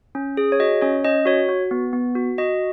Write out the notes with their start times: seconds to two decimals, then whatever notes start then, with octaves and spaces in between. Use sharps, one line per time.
0.15 C#4
0.37 G#4
0.52 C#5
0.60 F#4 D#5
0.81 C#4 C#5
1.05 C#4 D#5
1.26 F#4 C#5
1.49 F#4
1.71 B3
1.93 B3
2.15 F#4
2.38 F#4 D#5